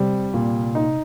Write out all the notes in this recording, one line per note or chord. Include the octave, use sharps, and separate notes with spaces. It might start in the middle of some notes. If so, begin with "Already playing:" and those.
Already playing: C3 G3 C4
A#2
D#4